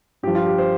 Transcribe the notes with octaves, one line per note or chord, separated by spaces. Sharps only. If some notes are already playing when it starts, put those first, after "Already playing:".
G2 F3 G4
F4
G4
C5